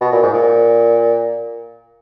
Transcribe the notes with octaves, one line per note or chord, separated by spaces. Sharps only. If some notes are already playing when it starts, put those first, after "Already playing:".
B2
A#2
G#2
A#2